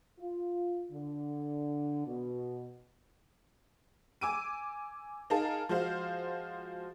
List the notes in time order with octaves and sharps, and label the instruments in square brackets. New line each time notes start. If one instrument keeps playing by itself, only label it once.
[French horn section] F4
D3
B2
[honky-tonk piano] G#5 D6 E6 D7 D#7
D#4 G#4 A#4 F5 A5
F3 G#3 F#4 C5 F5